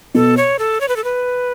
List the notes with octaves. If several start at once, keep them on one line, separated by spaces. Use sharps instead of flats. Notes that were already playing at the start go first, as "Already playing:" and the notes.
B2 A4
C#5
A4
C#5
B4
A4
B4